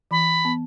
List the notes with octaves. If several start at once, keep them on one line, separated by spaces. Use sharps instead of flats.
E3 B5
B3